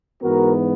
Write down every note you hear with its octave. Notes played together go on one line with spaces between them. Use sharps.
G#2 E3 B3 F#4 A#4